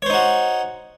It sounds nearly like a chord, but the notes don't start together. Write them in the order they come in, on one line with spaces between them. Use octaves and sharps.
C#5 C5 D#4 F#4